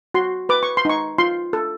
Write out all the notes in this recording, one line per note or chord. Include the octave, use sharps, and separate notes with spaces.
F#4 C6
B4 D6
C#6
C6
D#4 C#6
F4 C6
A4